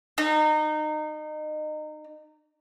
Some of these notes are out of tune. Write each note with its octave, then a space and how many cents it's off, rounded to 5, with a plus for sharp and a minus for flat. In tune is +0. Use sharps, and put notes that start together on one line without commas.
D#4 -25